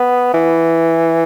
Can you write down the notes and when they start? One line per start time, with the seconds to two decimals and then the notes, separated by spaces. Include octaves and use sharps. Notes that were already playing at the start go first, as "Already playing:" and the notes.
Already playing: B3
0.34 E3